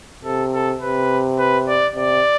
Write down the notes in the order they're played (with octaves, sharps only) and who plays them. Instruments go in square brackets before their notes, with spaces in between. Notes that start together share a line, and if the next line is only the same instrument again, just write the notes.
[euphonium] C3 [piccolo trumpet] A4
[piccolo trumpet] A4
[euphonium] C3 [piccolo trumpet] B4
[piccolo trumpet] B4
D5
[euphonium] C3 [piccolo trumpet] D5